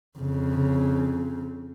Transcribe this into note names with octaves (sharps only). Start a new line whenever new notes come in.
F2 C#3